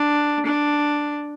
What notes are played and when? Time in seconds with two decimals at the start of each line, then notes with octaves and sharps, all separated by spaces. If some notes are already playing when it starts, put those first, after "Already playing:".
Already playing: D4
0.46 D4